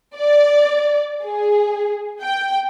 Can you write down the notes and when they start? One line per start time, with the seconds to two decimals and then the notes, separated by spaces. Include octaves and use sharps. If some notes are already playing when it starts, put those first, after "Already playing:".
0.15 D5
1.23 G#4
2.22 G5